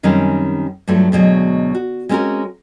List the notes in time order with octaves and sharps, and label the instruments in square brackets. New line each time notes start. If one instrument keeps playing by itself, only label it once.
[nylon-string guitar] F#2 D#3 G3 C4 C#4 A#4
G2 F3 F#3 A3
D2 B2 F#3 G#3
F#4
G#3 C4 C#4 D#4 F#4 A#4